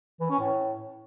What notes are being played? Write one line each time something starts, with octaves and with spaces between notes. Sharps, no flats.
E3
C#4
A2